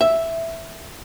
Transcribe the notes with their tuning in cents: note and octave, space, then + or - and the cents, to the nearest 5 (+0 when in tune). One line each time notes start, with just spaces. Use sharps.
E5 +0